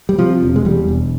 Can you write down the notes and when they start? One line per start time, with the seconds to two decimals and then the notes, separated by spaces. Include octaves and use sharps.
0.09 G3
0.18 C3 F3
0.43 E1
0.56 G#3
0.65 E2 G3
0.88 E1